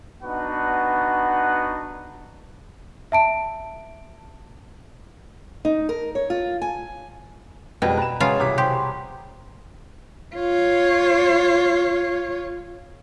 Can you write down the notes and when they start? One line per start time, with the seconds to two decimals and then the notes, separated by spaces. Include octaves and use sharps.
0.22 B3 D4 D#4 F#4 B4 F#5
3.12 E5 A5 D7
5.65 D#4
5.89 A#4
6.15 C#5
6.30 F4
6.62 G#5
7.82 F2 B2 G3 G#3 G5
7.97 B4 A#5 E7
8.20 C#3 E3 F#3 G#3 F4 G#4 F5 A#5
8.40 C2 D6 B6
8.58 G4 C5
8.72 B4
10.36 F4 C#5